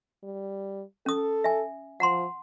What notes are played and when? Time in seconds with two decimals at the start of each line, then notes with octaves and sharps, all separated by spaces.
0.24 G3
1.06 C#4 A4 D#6
1.44 E5 G#5
2.00 F3 F#5 A#5 C6